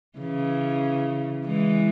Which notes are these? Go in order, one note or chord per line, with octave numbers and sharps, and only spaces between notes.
C#3 E3
E3 G#3